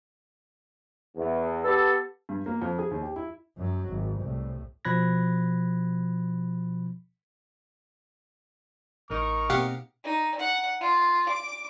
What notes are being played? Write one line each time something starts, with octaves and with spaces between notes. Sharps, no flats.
E2
B3 G4 A4
G2
A#3
F2
G#4
D#2
G4
E4
F#2 F#3
G#1
C2 A2
B2 F3 B5 F#6 G#6 A#6
A1 D#4 A#4 C#6
B2 A#3 C4 G4 F5 F#5
D#4
F#5
F4
D6